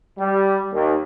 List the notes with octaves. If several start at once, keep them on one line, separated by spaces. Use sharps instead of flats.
G3
D#2